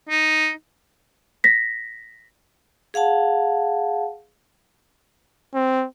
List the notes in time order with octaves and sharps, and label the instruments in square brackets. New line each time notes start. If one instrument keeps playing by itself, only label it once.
[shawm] D#4
[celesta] A#6 B6
[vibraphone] G#4 F5 F#5 A5
[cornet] C4